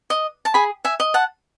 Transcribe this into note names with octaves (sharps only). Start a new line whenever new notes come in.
D#5
A5
G#4 G#5 B5
E5 G#5
D#5
F#5 A5